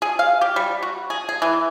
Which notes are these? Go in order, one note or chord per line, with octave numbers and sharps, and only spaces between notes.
G#4
F5
G4
G3
F#4
G#4
G#4
E3